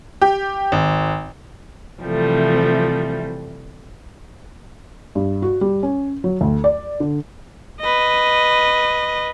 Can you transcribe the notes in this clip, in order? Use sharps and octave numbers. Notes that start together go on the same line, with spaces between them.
G4
G#1
C3 E3 F3 G3 A3
G2
F#4
G3
C#4
F#3
D2
D5
D3
B4 D#5